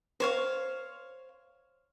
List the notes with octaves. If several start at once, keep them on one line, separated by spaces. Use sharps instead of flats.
C5 C#5 F5